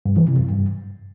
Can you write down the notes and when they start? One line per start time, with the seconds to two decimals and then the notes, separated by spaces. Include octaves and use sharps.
0.06 G2
0.17 E3
0.28 C3
0.39 F#2
0.50 G2